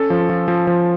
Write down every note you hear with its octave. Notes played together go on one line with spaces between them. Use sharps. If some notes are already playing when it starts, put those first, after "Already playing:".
Already playing: C#4 A4
F3
F3
F3
F3